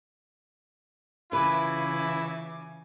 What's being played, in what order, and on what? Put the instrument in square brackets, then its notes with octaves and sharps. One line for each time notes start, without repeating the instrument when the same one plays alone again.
[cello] C#3 E3 [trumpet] E4 [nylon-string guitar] F4 B4 [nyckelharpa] G#5 D6